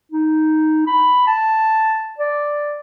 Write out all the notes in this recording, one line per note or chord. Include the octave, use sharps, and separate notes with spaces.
D#4
B5
A5
D5